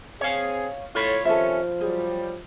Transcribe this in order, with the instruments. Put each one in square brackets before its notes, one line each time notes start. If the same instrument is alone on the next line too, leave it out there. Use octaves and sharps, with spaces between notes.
[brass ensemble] C4 G#4 [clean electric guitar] C#5 F5
[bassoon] A2 [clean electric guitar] F4 B5 [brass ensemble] C#5
[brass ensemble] C3 D#3 C#4 [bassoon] F3 [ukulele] A4 C#5 E5
[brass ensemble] F#3 G3 [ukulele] G#4